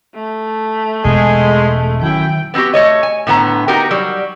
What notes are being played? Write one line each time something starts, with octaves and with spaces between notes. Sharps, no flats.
A3
E1 B2 G#3
F#2 D#3 F#3 E4 G5
B3 C4 D#4 F#4 G4
A3 C#5 D#5
G#5
A2 D3 B3 A#5
B3 D#4 F#4 G4 A#4
F#3 G3